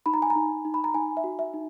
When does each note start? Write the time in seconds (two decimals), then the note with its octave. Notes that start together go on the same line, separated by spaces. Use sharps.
0.06 D#4 B5
0.14 A#5
0.22 G#5
0.30 A#5
0.35 D#4
0.65 D#4
0.74 B5
0.84 A#5
0.94 D#4 G#5
1.17 E5
1.24 F#4
1.39 E5
1.54 D#4